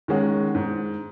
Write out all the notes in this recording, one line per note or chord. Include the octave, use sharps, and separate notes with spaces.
D#3 G#3 C#4 F#4
G#2